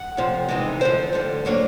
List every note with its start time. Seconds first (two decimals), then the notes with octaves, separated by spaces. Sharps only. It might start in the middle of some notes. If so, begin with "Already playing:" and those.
Already playing: F#5
0.17 F2 C3 F3
0.49 C3 E3 G#3 B3 D#4
0.81 F2 D3 F3 C5
1.13 D2 D3 G3
1.45 A2 F#3 A#3 D4 C#5